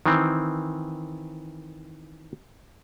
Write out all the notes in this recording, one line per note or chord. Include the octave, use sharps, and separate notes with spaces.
D#3 E3 C4